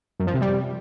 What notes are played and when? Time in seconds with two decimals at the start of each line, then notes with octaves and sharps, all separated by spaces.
0.19 F#2
0.27 F3
0.34 C3
0.41 G3